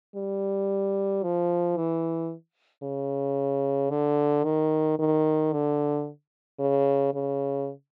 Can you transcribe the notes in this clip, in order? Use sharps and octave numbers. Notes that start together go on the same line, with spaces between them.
G3
F3
E3
C#3
D3
D#3
D#3
D3
C#3
C#3